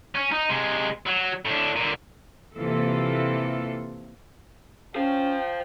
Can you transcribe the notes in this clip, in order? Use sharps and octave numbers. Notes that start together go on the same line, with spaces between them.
C#4
D#4
C3 G#3
F#3
A2 D4
A#2 D3
C3 E3 A#3 F4 A4
C#4 C5 F5 G5